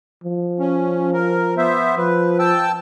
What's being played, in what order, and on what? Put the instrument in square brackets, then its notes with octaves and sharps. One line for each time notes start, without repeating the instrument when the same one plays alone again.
[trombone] F3
[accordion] C#4
A#4
B3 C5 E5
[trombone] F3 [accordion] B4
[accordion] G5 A5 E6